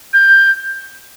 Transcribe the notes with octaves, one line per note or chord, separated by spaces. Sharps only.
G6